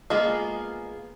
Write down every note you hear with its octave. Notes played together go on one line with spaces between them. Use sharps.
G#3 A#3 B3 F4 G#4